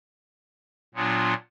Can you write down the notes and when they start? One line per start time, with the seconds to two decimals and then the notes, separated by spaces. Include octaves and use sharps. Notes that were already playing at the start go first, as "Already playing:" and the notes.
0.95 A#2 F#3 B3 D4 F4